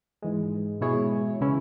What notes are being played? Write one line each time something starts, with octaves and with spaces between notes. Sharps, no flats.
G#2 E3 G#3
B2 G#3 E4 G#4 C#5
C#3 E3 C#4 E4